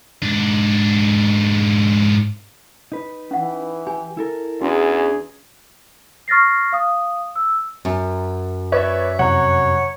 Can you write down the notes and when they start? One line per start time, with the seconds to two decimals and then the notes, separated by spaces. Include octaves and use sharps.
0.22 G#2 D4
2.92 D#4 B4
3.31 E3 C#4 F#5
3.87 G4 G#5
4.17 E4 A4 A#4
4.61 E2 C#4 D4 F#4 G#4
6.28 C#6 F6 A6 A#6 C7
6.72 F5 D#6
7.36 E6
7.85 F#2
8.72 B4 C#5 D5 E5
9.19 F2 C3 F#3 C#5 F#5 A#5